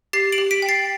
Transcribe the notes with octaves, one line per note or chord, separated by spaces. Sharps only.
G4 A6 C7
D7 F#7
G4
B6 D7
G5
A6 C7